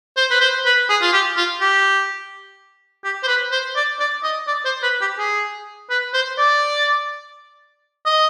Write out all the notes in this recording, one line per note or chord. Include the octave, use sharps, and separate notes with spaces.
C5
B4
C5
B4
G#4
F4
G4
F4
G4
G4
C5
B4
C5
D5
D5
D#5
D5
C5
B4
G4
G#4
B4
C5
D5
D#5